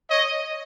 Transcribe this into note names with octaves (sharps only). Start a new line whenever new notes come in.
C#5 D#5